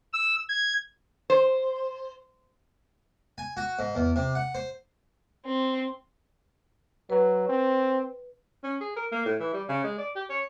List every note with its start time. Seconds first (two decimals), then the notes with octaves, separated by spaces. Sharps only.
0.13 E6
0.49 G#6
1.30 C5
3.38 G#5
3.57 F#4
3.79 G#2
3.95 E2
4.16 C3
4.35 F#5
4.55 C5
5.46 C4
7.10 F#3 B4
7.49 C4
8.64 C#4
8.81 G#4
8.96 A#4
9.12 A#3
9.26 A2
9.40 E3
9.53 G3
9.68 C#3
9.84 G#3
9.98 D5
10.15 G4
10.29 C#5